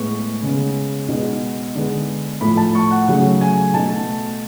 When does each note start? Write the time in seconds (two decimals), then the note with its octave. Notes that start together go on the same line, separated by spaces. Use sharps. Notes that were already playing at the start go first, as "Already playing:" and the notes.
Already playing: A2 G#3 B3 C#6
0.43 C#3 G#3 B3
1.09 B2 G#3 B3
1.75 D3 G#3 B3
2.41 A2 F3 A3 B5
2.57 A5
2.75 C#6
2.91 F#5
3.07 C#3 F#3 A3 F#5
3.41 G#5
3.73 B2 A3 A5